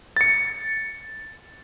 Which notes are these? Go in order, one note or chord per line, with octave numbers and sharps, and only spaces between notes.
A6 C#7